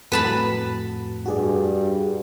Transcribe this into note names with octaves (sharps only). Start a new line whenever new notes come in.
F2 A2 F#4 B4 A5 B5
G2 F#4 G#4 D5